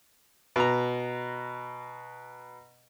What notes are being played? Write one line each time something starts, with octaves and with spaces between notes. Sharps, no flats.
B2 A#5